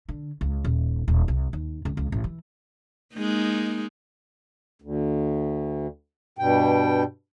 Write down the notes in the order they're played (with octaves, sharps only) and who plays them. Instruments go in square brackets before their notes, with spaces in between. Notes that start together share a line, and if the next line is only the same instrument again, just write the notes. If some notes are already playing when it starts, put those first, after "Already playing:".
[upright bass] D3
C#2
D#1
D#1
C2
D#2
C#2
C#2
A1
E3
[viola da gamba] G#3 A#3 D#4
[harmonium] D2
G2 B2 G5